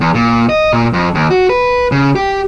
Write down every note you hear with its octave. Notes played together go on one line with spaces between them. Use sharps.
E2
A#2
D#5
A#2
F2
D#2
F#4
B4
C#3
G4